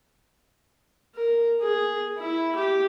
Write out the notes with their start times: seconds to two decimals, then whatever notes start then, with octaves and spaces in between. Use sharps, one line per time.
1.15 A#4
1.62 G#4
2.19 E4
2.56 G4